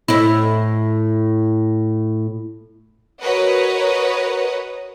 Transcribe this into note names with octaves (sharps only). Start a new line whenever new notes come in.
A2 E4
F#4 A#4 B4 C#5 D#5 F#5